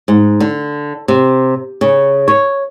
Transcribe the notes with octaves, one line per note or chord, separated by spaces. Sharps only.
G#2
D3
C3
C#3
C#5